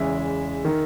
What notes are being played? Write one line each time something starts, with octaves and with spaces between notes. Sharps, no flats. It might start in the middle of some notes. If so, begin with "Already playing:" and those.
Already playing: E2 C#3 E3 G#3 E5
D#3